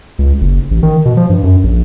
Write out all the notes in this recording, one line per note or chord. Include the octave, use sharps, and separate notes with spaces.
C#2
F#1
A1
D#3
B2
F3
G2
F#2
A#1